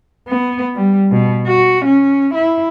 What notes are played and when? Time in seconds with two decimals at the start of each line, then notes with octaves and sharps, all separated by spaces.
0.28 B3
0.76 G3
1.11 B2
1.48 F#4
1.86 C#4
2.35 E4